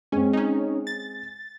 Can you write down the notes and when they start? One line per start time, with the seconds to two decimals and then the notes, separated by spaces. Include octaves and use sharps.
0.12 G#3 C4 C#4
0.33 C#4 D#4
0.87 A6